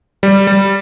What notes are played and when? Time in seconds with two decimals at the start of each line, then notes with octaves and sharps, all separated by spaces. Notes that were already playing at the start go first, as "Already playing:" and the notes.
0.23 G3
0.47 G3